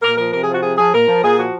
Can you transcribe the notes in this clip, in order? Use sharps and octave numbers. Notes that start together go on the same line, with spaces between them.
A#2 A#4
F3 A#4
C3 A#4
F3 G#4
F#4
C3 G#4
F3 G#4
A#2 A#4
F3
A#2 G#4
F3 F#4